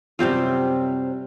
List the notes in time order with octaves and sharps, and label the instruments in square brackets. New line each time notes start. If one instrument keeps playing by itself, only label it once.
[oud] F#2 C3 [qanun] G3 C4 F4